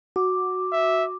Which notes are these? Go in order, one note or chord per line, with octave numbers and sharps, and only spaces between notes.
F#4 D6
E5